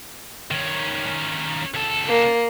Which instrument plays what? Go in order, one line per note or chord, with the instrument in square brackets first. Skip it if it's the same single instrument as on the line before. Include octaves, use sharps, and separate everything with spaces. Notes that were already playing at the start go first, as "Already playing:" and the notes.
[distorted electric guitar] D#3 C#4
C#2 A4
[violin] A#3